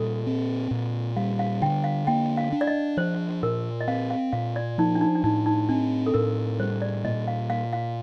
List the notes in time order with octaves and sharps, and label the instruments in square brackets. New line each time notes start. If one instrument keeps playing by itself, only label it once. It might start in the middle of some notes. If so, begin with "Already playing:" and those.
Already playing: [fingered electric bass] A#2 G3 [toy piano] A4
[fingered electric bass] C4
A#2
[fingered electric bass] G3 [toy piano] F5
[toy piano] F5
[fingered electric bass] D3 [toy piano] G5
[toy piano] F5
[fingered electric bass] A#3 [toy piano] G5
[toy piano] F5
[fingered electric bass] D4
[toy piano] D5
D#5
[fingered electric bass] F3 [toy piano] C5
[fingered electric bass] A#2 [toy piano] A#4
[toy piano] D#5
[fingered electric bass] C4 [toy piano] F5
[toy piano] F5
[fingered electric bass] A#2 [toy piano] F5
[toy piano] D5
[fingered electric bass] F3 [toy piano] D#4
[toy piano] D4
D#4
D4
[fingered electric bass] A2 [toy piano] D#4
[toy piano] D#4
[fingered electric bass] C4 [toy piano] D4
[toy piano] A4
[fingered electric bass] A2 [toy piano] A#4
[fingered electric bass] G3 [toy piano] C5
[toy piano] D5
[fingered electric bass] A#2 [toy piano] D#5
[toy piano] F5
[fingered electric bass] A#3 [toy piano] F5
[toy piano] F5